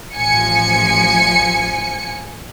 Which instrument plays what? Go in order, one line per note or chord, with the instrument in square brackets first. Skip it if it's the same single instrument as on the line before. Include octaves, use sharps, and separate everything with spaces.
[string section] A1 F3 G#5 C#7